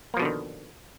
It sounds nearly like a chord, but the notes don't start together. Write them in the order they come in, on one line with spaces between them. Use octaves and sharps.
A#3 F3 B2 D3 D#3